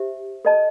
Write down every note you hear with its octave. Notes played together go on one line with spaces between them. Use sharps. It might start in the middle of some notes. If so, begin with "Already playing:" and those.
Already playing: G4 C5 E5
A4 D#5 A5